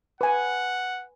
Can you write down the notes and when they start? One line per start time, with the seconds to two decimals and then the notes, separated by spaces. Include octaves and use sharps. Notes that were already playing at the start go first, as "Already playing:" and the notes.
0.21 B4 F#5 G#5